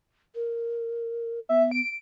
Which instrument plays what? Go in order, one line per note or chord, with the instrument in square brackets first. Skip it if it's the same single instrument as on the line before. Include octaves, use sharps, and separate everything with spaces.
[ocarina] A#4
[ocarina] B3 [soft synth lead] E5
[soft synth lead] D7